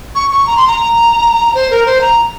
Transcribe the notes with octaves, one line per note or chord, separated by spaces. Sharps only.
C#6
C#6
A#5
C6
A#5
C5
A#4
C5
A#5